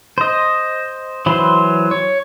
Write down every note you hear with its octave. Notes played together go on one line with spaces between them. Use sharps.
C5 D#5
E3 F#3 C5 B5 C6
C#5